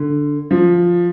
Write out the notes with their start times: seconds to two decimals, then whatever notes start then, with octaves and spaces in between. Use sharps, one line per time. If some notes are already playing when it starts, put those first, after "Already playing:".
Already playing: D3
0.51 F3